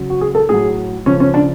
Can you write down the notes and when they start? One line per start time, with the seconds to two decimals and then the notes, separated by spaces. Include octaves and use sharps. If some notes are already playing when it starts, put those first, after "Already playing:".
Already playing: C#3 F#3
0.10 F#4
0.21 G#4
0.35 A4
0.49 A2 F#3 G#4
1.06 C#3 F3 C#4
1.20 C#4
1.34 D4